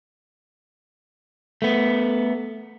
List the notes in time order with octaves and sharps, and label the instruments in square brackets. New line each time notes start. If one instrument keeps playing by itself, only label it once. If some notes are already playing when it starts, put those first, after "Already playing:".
[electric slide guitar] A3 B3